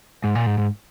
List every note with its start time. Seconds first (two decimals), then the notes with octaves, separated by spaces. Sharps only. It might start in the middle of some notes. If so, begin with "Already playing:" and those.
0.24 G#2
0.35 A#2
0.46 G#2
0.58 G#2